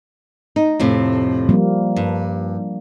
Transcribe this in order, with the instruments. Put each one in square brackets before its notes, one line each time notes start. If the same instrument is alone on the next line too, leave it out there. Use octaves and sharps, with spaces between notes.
[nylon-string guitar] D#4
F2 A2 C3
[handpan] F3 G3 A#3
[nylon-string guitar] G2